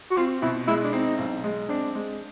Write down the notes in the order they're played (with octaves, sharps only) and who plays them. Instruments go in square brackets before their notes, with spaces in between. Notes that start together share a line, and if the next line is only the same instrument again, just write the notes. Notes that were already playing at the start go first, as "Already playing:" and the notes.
[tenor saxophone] F#4
[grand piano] C4 [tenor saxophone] F4
[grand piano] B2 [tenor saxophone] E4
[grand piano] G#3 [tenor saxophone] E4
[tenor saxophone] D4
[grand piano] C4 [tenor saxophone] D#4
[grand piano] B1
G#3
[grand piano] C4 [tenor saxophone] D4
[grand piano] G#3